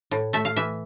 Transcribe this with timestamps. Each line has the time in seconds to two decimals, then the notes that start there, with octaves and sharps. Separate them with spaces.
0.11 A2
0.33 A3 E5
0.45 F5
0.56 E3 E5